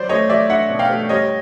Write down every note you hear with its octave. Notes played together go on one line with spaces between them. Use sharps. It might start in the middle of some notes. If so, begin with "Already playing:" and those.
Already playing: F#3 C5 D5
A3 C#5 D#5
F#3 D5 E5
D4 E5 F#5
B2
F5 G5
A3
G3 C#5 D#5